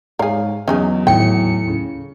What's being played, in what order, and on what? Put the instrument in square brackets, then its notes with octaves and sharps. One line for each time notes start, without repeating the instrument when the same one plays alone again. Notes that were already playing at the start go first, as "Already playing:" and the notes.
[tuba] G#2 [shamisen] G#4 A#4 [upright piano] C#5 F5
[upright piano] E2 [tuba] F#3 [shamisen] C#4 D#4 G#4
[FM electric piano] D#2 A2 C#7 [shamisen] G5
[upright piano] C#3